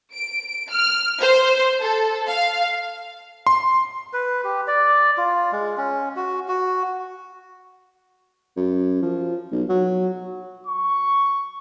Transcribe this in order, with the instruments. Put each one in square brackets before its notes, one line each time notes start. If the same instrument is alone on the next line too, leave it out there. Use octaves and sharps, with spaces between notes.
[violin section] D7
F6
C5
A4
F5
[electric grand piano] C6
[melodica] B4
G4
D5
F4
G#3
C#4
F#4
F#4
[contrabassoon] F#2
F3
B1
F#3
[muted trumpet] C#6